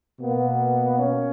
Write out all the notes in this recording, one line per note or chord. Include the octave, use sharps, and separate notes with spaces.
B2 A#3 B3
C#4